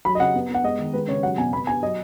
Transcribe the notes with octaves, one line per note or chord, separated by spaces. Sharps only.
F#3 B5
D#5
C#3 F#5
B3
B3
F#5
G#3 D#5
D#3
G#3 B4
C#3 C#5
F#3 F#5
B2 G#5
B3 B5
B3 G#5
F#3 D#5